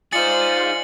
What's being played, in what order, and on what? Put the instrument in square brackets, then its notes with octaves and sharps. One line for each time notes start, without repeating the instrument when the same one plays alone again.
[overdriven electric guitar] D#4 G#4 [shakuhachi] F4 [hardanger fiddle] C5 D5 [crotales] A6 C#7 F#7